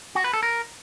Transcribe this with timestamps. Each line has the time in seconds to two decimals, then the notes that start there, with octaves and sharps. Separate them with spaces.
0.15 F#4
0.24 B4
0.33 A4
0.43 A#4